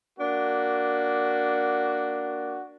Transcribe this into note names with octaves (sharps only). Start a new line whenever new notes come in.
A#3 D4 F#4